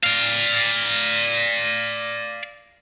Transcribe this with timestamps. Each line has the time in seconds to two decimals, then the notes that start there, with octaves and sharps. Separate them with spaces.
0.04 D5 F5